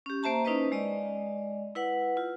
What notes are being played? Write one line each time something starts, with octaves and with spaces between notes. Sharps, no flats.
C#4 G4
A#3 C5 E5 A5 A#5
C#4 D#4 E4 B4 C5 D#5
G#3 D5 D#5
E4 B4 F#5
F4